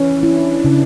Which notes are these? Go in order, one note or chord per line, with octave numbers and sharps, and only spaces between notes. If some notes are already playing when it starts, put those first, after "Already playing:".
Already playing: E3 C#4
D4 E4
C#3